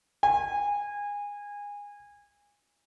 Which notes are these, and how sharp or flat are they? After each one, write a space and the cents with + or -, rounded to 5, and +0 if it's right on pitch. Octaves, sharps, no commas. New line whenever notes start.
G#5 -25